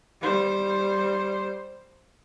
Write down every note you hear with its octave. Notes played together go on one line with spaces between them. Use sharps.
G3 C5